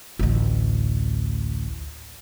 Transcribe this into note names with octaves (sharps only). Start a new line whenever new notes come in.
A1 D2